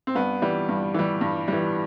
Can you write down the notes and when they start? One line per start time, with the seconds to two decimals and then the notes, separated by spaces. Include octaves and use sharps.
0.07 C4
0.15 G2 B3
0.42 E3 G3
0.69 G2
0.94 E3 G3
1.21 G2
1.48 E3 G3